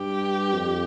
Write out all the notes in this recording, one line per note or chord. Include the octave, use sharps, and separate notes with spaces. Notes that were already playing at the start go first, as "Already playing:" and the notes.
Already playing: G2 G4
F2